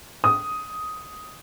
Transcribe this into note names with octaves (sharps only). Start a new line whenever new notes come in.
D#6